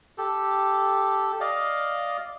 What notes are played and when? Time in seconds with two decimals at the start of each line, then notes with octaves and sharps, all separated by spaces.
0.18 G4 A4
1.41 D5 D#5 F5